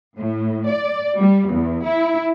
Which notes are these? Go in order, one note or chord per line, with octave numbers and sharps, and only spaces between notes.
A2
D5
G3
E2
E4